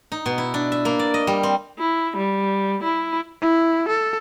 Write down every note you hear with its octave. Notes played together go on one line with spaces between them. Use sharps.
D#4
B2
E4
D4
E5
A#3
D5
D#5
G3
C4
E4
G3
E4
E4
A4